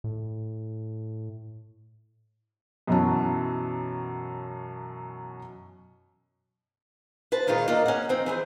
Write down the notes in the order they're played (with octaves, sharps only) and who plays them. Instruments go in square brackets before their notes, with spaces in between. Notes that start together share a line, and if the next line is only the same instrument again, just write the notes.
[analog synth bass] A2
[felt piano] F#2 B2 E3 F#3 C#4 A5
[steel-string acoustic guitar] B4 C5 A5
A#2 D#3 G#3 D#4 F4
A#3 D4 F4 A#4 D#5
C#4 F#5
F3 C4 D#4
E3 G#4 C5